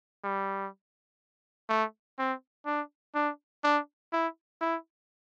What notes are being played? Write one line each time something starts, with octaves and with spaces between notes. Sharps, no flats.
G3
A3
C4
D4
D4
D4
E4
E4